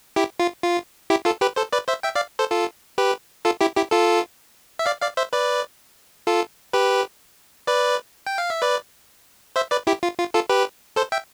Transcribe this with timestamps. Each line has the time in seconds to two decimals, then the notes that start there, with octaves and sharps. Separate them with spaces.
0.16 E4 G4
0.40 F4
0.63 F4
1.10 E4 G4
1.25 F4 A4
1.41 G4 B4
1.56 A4 C5
1.73 B4 D5
1.88 C5 E5
2.03 E5 G5
2.15 D5 F5
2.39 A4 C5
2.51 F4 A4
2.98 G4 B4
3.45 F4 A4
3.61 E4 G4
3.76 E4 G4
3.91 F4 A4
4.79 E5
4.86 D5 F5
5.01 D5 F5
5.17 C5 E5
5.33 B4 D5
6.27 F4 A4
6.73 G4 B4
7.67 B4 D5
8.27 G5
8.38 F5
8.50 E5
8.62 B4 D5
9.56 C5 E5
9.71 B4 D5
9.87 E4 G4
10.03 F4
10.19 F4
10.34 F4 A4
10.49 G4 B4
10.96 A4 C5
11.12 E5 G5